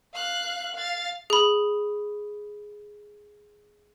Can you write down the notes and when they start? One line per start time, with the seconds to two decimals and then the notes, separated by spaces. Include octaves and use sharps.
0.14 F5 F#6
0.75 F5 A6
1.30 G#4 B5